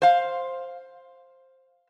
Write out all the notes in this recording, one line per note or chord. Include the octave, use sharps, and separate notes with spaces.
C5 F5